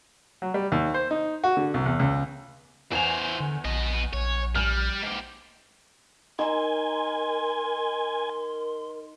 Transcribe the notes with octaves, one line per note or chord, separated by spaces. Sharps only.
F#3
G3
D#2
C5
D#4
F#4
D3
C2
E2
C#2
E2 E3 C5 G#5 F7
D3
A#1 B3 D#5
A#1 C#5
G3 F6
G#2 G4
D#4 A#4 G#5 C6 E6